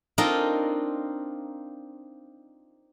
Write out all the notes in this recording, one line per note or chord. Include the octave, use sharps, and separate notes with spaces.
C4 D4 D#4 F4 A#4 D#5